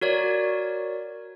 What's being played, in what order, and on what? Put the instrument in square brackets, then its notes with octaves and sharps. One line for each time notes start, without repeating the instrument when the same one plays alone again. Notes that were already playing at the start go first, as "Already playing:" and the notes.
[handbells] F#4 A#4 C#5 D5